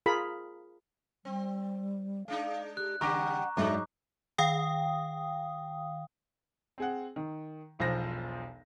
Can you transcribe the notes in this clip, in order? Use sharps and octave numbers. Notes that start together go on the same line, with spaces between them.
F4 G#4 A#4 B5
G3 C4
G#3 D4 D#4 F5
G4 F#6
C#3 G3 G4 F#5 A#5 C#6 D6 A#6
G#2 F#3 G#3 D4 F#4 E5 D6
D#3 F5 G5 D#6
C4 G#4 F#5
D#3
E1 B1 F3 C5 A#6